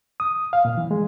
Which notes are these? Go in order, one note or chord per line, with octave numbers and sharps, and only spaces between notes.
D#6
F5
A#2
E3
G#3